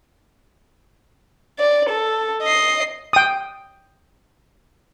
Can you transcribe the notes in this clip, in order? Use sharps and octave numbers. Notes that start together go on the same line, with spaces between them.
D5
A4
D#5 C7
G5 D#6